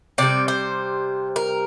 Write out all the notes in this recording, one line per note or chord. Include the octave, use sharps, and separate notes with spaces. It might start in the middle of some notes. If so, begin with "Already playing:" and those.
C3 G3 D5
C5
A#4